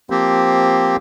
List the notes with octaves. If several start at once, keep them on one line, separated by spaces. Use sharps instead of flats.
F3 A#3 C4 G4